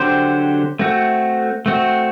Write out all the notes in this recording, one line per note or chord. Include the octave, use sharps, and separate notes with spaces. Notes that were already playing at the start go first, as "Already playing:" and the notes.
Already playing: D3 F#3 C4 G4 C5
A3 C4 F#4
A3 C4 F#4